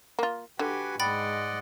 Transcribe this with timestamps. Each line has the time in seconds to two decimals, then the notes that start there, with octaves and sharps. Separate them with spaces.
0.19 A#3 F4
0.59 D3 F#4 G4 B4 G#5
1.00 G#2 G#3 D5 D#5 F#5 G5 B5 A6